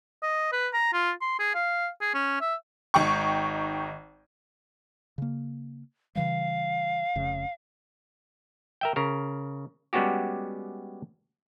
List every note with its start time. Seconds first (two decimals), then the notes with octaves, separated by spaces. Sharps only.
0.23 D#5
0.52 B4
0.74 A#5
0.93 F4
1.21 C6
1.39 G#4
1.54 F5
2.01 G#4
2.14 C#4
2.41 E5
2.94 G#1 D#4 G5 C#6
5.18 C#3 A#3
6.15 C#3 E3 G3 F5
7.16 F1 C#3
8.81 A#4 E5 G5
8.96 C#3 A#4
9.93 G3 G#3 B3 C#4 F#4 G4